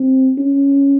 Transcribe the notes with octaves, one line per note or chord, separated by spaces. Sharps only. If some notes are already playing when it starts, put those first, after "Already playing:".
Already playing: C4
C#4